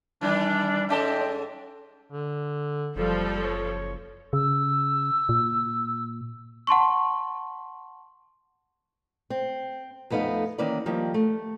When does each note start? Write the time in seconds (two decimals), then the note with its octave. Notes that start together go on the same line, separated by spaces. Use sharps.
0.21 D#3 E3 G3 D4
0.89 G#2 C#4 A4 D#5 E5 G5
2.12 D3
2.96 F#1 F3 G3 A4
3.43 C#5
4.33 C#3 E6
5.29 A#2
6.67 F#5 A5 C6 C#6
9.30 C4
10.10 F2 A3 B3 D#4 F5
10.58 D#3 E3 A#3 C#4 B4 D5
10.86 D#3 F3 G3 A#3
11.14 A3